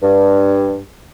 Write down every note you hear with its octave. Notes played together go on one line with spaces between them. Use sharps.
G2